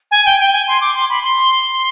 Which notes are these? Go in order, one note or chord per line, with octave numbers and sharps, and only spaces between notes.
G#5
G5
G5
G#5
C6
D6
C6
B5
C6